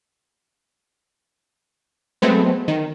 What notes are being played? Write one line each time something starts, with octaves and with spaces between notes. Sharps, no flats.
F#3 G#3 A3 B3 C4
D#3